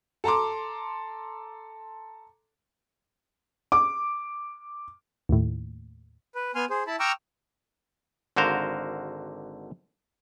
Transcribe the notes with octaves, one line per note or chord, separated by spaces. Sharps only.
A4 A5 A#5 C6 D6
D6
D#2 A2
B4
B3 G#5 C6 F6
G#4 C5
E4 A5 B5
G5 A#5 C#6 D6 E6 F6
G#1 D3 F#4 A#4 C5 F5